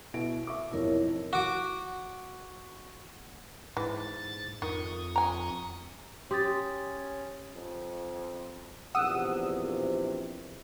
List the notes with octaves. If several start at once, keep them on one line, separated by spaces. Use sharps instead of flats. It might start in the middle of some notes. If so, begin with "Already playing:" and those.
B2 E4 D7
E5 C#6 D6
B1 F2 C3 E4 A#4 C#5
F#4 D6
G#2 E3 A6
F2 D#3 C#6 D#6
G#5 A#5
C#4 G4 C6 D#6 A6
F2
A#1 E2 C3 F#5 D#6 E6